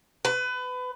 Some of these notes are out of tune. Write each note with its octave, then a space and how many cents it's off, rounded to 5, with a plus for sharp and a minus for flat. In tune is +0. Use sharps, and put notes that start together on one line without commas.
B4 +25